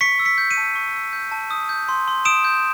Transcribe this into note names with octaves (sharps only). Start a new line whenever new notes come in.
C#6 B6 C#7
E6
B6 C#7
G6
C#7 D#7
A5
C#6
E6
G6
A5
D#6
G6
C6
C6
D#6 D7 E7
G6